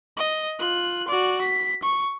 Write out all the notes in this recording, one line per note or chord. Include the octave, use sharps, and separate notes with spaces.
D#5
F4 F#6
F#4 D5
B6
C#6